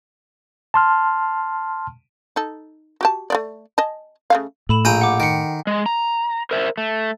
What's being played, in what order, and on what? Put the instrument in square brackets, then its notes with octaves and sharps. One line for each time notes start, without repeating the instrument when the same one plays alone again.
[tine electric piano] A5 C6 F6
[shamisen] D#4 A4
F#4 G4 A5
A3 B3 D5
D#5 G#5 A5
C#3 A3 F5
[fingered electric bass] A2 [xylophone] A4 B5 E7
[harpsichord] A#1 G5 A#5 [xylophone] G#5
[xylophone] F#5 D6
[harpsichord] D#3 [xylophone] G5 C#7
[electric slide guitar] G#3
A#5
A#4 C5 E5
A3